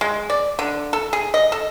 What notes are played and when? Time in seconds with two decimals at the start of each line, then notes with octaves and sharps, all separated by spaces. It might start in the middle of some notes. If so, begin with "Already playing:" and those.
0.01 G#3
0.30 D5
0.59 D3
0.93 A4
1.13 G#4
1.34 D#5
1.52 A4